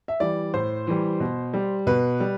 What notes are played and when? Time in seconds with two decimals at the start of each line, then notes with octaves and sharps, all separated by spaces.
0.08 E5
0.20 E3 G3 D5
0.54 A2 C5
0.87 E3 G3
1.20 B2
1.54 G3
1.87 B2 B4
2.20 G3